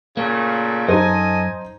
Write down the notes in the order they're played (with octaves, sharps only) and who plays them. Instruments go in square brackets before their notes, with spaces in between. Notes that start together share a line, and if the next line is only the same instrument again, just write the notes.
[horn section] A#2 C#3 A3 [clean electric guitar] A#3
[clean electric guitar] F#2 [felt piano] D#4 C5 [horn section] A4 D#5 G#5